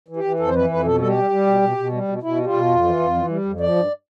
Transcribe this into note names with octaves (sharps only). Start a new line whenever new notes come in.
E3
G4
E3
F2 A4
C5
E3 B4
F2 B4
B2 A4
G3 A4
G4
G3
G3
B2
B2
B2
G3
B2
B2 E4
G3
F4
B2
F2
E3
F2
E3
G3
F2
F3 D5
G2